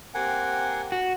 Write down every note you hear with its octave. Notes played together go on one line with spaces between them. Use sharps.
A#3 C4 G4 F#5 G#5
F#4